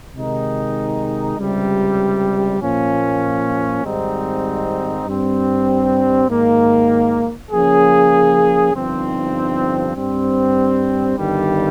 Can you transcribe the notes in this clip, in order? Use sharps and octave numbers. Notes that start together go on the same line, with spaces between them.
C3 D#3 G#3 D#4
C#2 C3 G3
A#2 F3 A#3 C#4
G#1 G#2 G3 C4 D#4
G2 G3 C4
G#2 D#3 A#3
C#3 F3 A#3 C#4 G#4
G1 G2 F3 C4 D#4
G2 G3 C4
G1 G2 D#3 G3